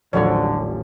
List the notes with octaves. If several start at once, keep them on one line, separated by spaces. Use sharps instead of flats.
D#1 A1 D3 F3 F#3 C#5 D5